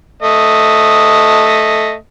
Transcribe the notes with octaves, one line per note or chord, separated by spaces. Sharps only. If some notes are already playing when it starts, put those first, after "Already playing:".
A3 D#5